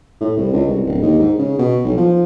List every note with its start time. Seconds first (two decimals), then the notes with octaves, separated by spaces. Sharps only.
0.21 A2
0.37 C2
0.53 C#2
0.67 C2
0.87 D1
1.02 D#2
1.19 G#2
1.39 C#3
1.58 B2
1.85 B1
1.97 F3